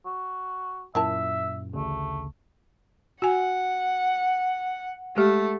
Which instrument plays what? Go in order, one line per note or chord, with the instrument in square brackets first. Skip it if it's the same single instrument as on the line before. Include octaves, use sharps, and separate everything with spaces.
[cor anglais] F#4
[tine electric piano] F#2 A#2 [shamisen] E4 A#4 A5 [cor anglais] E5
[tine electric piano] A1 D2 C#3 [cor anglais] A3
[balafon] F#4 G#5 [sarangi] F#5
[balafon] G#3 G4 [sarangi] A3